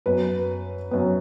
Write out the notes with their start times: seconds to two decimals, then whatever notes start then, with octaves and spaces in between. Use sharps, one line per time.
0.06 F#2 F#3 B3 B4
0.91 F#2 F#3 B3